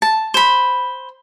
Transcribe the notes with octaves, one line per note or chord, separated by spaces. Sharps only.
A5
C5 B5